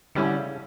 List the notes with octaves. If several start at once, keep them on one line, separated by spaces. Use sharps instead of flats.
D3 G3 C#4 E4
C#3